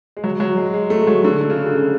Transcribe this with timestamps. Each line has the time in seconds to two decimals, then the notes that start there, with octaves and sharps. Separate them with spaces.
0.17 G#3
0.24 F#3
0.40 F#3
0.57 G#3
0.74 G#3
0.90 A3
1.07 F#3
1.24 D3
1.50 C#3
1.66 D3
1.75 C#3